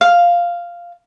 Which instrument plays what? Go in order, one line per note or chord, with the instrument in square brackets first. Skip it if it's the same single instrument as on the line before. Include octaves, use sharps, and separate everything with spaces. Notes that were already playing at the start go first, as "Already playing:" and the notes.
[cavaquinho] F5